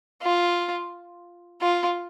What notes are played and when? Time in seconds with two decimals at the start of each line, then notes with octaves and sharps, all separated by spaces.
0.22 F4
1.61 F4